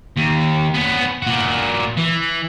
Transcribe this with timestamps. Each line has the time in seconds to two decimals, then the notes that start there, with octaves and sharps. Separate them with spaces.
0.17 D#2
0.74 B3 C#4
1.22 A#2 F#4
1.97 E3